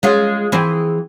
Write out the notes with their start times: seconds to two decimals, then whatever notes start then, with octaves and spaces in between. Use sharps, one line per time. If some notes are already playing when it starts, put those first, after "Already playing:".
0.03 G#3 C#4 F4
0.52 E3 C4 G#4